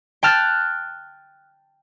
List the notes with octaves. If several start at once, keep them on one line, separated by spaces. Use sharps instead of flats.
G5 A5 F6 F#6 A6